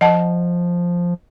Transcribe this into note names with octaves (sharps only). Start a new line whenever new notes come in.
F3 D#5 F#5 A5